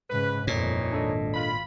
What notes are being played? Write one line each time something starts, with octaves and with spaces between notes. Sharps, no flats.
G#2 C#3 B4
G1 F2 A#2 E3 D#4 C#5
G#1 D4 A4 D#5
F4 B5